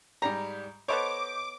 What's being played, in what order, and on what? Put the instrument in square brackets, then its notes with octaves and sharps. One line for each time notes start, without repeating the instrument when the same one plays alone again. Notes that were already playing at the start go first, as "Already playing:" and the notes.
[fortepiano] G#2 G3 G4 [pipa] A#5
[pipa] B3 A4 C#5 [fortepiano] C5 D#5 B5 [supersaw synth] D6